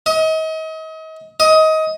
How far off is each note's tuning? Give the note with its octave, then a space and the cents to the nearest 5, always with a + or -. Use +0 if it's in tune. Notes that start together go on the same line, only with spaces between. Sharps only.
D#5 +35
D#5 +20